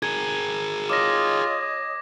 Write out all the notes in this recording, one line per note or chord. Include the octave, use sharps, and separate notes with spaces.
G#4 A#4 G#6
F4 C#5 D#5 D6 D#6 A#6